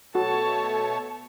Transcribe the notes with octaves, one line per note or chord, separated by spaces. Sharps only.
B2 A3 F#4 A4 C#5 A5